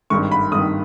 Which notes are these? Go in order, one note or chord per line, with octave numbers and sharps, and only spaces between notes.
G#1 G2 D#3 C#6
B5
G#1 G2 D#3 D#6